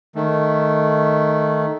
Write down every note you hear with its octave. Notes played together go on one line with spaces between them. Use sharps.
D#3 A3